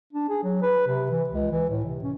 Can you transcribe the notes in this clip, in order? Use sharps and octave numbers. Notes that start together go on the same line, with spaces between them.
D4
G#4
F#3
B4
C3
E3
C#2
E3
A2
C3
C#4